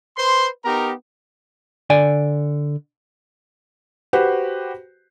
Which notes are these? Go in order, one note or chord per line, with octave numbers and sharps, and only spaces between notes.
B4 C5 C6
B3 D#4 G4 A#4 A#5
D3 D5 G#5
F#4 G4 B4 C5